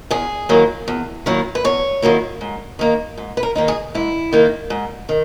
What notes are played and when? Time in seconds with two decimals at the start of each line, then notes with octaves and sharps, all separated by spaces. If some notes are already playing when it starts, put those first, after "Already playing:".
0.11 E2 G#4
0.49 D#3 F#3 A#3 E4
0.88 E2
1.26 D#3 F#3 A#3 E4
1.55 B4
1.64 E2 C#5
2.02 D#3 F#3 A#3 E4
2.41 G#2
2.79 D#3 A#3 D#4
3.17 G#2
3.37 B4
3.43 A#4
3.55 D#3 A#3 D#4
3.68 G#4
3.95 G#2 E4
4.33 D#3 A#3 D#4
4.70 G#2
5.09 D#3